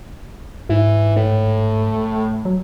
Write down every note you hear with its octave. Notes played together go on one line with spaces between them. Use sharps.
G#2 E3
A2
F#3